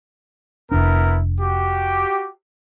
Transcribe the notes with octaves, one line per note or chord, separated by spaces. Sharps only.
F1 B3 D4 E4 A#4
F#4 G4